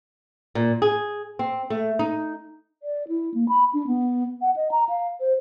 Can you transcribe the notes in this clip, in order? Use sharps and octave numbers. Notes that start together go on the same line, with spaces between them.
A#2
G#4
C4
A3
D#4
D5
E4
A#3
B5
D4
B3
F#5
D#5
A#5
F5
C5